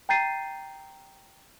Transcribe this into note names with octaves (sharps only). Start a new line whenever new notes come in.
G5 A#5 G6 A6 C7 D#7